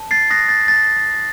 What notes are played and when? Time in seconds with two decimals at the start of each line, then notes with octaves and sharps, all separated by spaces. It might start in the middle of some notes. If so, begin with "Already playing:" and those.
Already playing: A5
0.11 A6 C7
0.30 D#6 F#6 A#6
0.49 A6
0.68 A5 A6